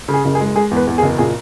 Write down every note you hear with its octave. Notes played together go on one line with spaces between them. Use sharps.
C#3
G#4
F#1
G#4
G#3
G#3 G#4
E2
B4
E2
G#4
F#1
A#2 G#4